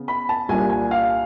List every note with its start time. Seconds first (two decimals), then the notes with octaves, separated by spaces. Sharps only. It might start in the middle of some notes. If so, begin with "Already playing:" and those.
Already playing: C#3 B3
0.08 B5
0.29 A5
0.49 C2 A#2 G3 A#3 D4 G#5
0.70 G#5
0.91 F5